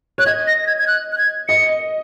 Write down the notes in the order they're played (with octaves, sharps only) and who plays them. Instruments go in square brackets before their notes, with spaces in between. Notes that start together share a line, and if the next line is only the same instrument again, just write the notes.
[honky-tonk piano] C#5 [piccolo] F#6
[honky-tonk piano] D#5 [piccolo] G#6
[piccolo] A#6
A#6
G#6
G#6
F#6
F#6
G#6
[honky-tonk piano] D#5 [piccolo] C#7